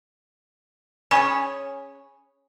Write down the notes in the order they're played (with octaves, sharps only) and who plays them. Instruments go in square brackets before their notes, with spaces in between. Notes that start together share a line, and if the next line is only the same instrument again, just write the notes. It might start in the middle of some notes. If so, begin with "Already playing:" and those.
[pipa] C#4 G#4 C#5 [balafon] G#5 B5 C#6